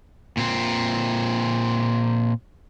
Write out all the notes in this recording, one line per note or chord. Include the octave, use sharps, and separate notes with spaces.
A#2 C4